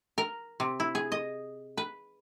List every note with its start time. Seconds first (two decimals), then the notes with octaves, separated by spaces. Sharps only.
0.18 A#4
0.60 C3
0.80 E4
0.95 G#4
1.12 D#5
1.77 B4